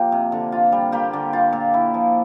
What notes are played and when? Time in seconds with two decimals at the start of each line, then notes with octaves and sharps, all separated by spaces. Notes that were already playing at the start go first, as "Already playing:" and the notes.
Already playing: F3 A#3 F4 G4
0.12 C3
0.32 D3
0.52 F4
0.72 G3
0.92 A#3 G4
1.13 D3
1.33 F4
1.52 A#2
1.74 E4
1.94 F3